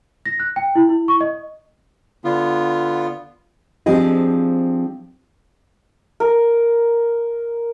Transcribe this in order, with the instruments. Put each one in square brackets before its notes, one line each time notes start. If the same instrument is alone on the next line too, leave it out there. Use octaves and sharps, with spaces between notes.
[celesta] A#6
F#6
G5
E4
E4
C#6
D#5
[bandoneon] D3 B3 F4
[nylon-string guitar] F3 C4 D4 G4 G#4 D#5
[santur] A#4